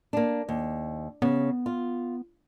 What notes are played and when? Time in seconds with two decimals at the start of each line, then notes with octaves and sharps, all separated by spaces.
0.13 A#3 D4
0.49 D#2
1.22 C#3 B3
1.66 F4